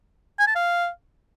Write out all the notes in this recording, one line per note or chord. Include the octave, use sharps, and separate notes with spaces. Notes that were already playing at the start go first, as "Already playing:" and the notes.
G#5
A5
F5